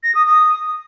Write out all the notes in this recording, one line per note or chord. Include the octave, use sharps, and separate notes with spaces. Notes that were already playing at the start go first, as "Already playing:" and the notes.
A#6
D#6
D#6